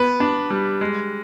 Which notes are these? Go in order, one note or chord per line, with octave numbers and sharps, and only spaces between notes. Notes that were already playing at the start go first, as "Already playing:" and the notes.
Already playing: B3 B4
D4
G3
G#3